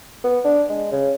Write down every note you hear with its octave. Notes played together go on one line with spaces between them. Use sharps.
B3
D4
G#3
C#3